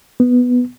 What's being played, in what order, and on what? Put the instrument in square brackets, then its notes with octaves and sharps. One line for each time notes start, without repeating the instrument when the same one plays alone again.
[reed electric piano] B3